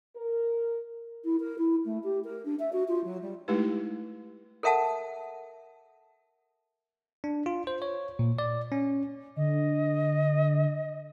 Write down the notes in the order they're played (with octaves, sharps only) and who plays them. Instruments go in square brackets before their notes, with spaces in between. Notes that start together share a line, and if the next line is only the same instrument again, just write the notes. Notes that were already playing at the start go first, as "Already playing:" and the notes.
[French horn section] A#4
[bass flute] E4
A#4
E4
A3
G4
A#4
D4
E5
F#4
F4
F#3
G3
[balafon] G#3 A3 D#4 E4 G4 B4
[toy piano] A4 A#4 E5 F#5 A5
[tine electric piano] D4
F4
C5
C#5
A#2
D5
C#4
[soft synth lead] D3 [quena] D#5